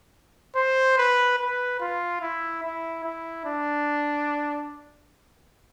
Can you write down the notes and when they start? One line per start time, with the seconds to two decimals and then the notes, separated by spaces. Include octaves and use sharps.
0.56 C5
0.98 B4
1.39 B4
1.80 F4
2.21 E4
2.63 E4
3.04 E4
3.45 D4